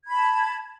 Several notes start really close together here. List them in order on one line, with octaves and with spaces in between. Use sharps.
G#6 B5 A5